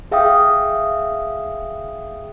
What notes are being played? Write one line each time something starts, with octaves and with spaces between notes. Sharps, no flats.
G#4 E5 F5 G5 D#6